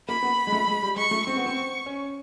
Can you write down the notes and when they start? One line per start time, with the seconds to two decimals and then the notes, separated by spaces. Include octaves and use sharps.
0.08 A#3 B5
0.23 B3
0.47 G#3
0.52 A3
0.68 G#3
0.82 G3
0.96 G#3 C#6
1.11 A3
1.26 C4 C#6
1.36 B3
1.46 C4
1.86 C#4